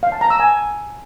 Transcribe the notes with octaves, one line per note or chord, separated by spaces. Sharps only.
F5
A5
A#5
E6
G#5